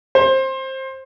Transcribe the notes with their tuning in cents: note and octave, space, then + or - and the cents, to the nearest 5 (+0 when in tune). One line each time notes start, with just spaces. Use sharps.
C5 +20